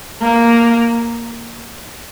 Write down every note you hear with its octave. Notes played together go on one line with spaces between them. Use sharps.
A#3